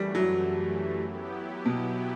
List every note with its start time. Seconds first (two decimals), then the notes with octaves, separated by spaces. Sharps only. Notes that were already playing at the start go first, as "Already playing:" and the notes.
Already playing: F#2 E3 G3 A3
0.15 F#3
1.01 F#3 B3 E4 G4
1.66 B2